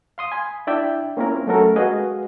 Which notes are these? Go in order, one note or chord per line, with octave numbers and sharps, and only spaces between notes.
F5 C6 D#6
G#5 B5
D4 E4 D5 E5 G5
A#3 C4 C#4 E4 F4 A#4
F#3 A3 C#4 F#4 A4 A#4
G#3 F#4 G#4 B4 D#5 F5